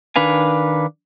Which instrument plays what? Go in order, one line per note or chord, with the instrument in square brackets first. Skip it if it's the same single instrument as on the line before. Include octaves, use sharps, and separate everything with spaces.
[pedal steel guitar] D#3 D4 B4 F5 G#5